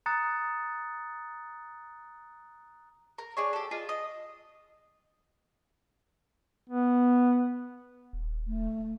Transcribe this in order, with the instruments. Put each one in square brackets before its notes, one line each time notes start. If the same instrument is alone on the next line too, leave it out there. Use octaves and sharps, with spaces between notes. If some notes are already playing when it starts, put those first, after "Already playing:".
[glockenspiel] A#5 D#6 F#6 A6 C#7
[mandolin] A#4
D4 G#4 C#5
G4 A4
F4 G#4 D5 D#5
D#5
[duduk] B3
[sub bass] D#1
[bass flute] A3